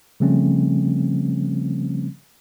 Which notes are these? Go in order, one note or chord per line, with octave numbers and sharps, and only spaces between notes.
C#3 F3 G3 A3 C4 C#4